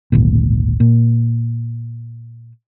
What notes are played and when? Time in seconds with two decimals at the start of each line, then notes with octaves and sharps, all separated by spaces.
0.12 D1 G#1 A#2
0.80 A#2